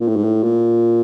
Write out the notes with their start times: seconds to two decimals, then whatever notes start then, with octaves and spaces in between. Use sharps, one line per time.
0.01 A#2
0.08 A2
0.16 G#2
0.24 A2
0.43 A#2